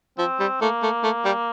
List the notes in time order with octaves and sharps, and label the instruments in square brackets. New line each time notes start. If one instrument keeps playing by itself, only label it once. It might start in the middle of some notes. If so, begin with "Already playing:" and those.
[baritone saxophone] F3 [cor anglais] C4
[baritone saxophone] G3
[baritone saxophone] A3 [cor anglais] A#3
[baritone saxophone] A3
A3
G3